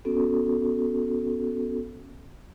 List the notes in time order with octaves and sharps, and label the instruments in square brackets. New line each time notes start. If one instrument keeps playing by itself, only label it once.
[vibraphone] B3 C#4 F#4 A4